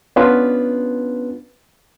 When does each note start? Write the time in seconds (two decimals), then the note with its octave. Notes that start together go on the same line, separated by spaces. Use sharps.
0.16 B3 C#4 D4 F4 B4